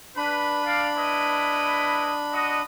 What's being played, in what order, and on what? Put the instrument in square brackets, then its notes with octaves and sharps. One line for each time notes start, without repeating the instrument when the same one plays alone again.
[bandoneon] D4 B5 [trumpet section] B4
[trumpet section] D5 F5
E4 B4 D#5
F#4 D#5